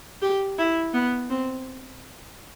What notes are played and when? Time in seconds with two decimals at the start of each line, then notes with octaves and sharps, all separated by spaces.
0.22 G4
0.59 E4
0.94 B3
1.30 C4